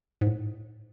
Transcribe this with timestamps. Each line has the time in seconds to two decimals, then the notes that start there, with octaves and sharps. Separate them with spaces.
0.21 G#2
0.27 A2